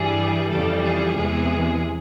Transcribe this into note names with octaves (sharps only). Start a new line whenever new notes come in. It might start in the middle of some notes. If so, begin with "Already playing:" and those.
Already playing: G2 E3 G3 G#4
F2 C#3 E3 G3 A4
G#4
E2 C3 E3 G#3